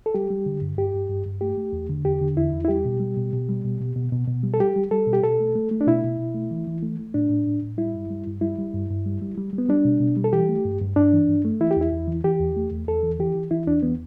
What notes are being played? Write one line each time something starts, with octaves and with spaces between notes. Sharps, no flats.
A4
G3 G4
G3
D3
G2
G2 G4
G2
G2
G2
A3 G4
A3
E2
D3
E2 G4
D3
E2 E4
E2
E4
G3 G4
B2
G3
B2
B2
G3
B2
B2
B2
B2
B2
G3
A4
G3 G4
G3
G3 A4
B2
G4
B2 A4
A3
A3
A3
D4
B2 E4
B2
B2
A3
E3
E3
A3
A3
A2 D4
A2
A2
A2
G3 E4
G2
G3
G2
G3 E4
G3
G2
G2
G3
G3
G3
G3
B3
G3 D4
B2
B2
G3
A4
E3 G4
A3
G2
G2
G2 D4
E3
G2
A3
E3 E4
G4
E2 E4
E2
E3
E3 G4
E2
A3
E2
E2 A4
E3
E3 G4
E3
E3 E4
E2 D4
E3 B3